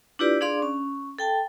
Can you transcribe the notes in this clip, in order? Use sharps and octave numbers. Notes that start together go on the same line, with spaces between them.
D4 E4 F4 G4 B4 D5
D4 G#4 D5 F5 C6 D6
C#4
A4 G5 A5